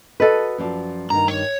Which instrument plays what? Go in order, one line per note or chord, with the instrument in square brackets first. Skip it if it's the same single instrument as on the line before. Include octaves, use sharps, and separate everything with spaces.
[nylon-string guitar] F#4 D#5 [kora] A4 B4
[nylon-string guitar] F#2 F3 D5
[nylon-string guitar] G2 D#3 [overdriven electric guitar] A#5
[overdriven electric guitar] C#5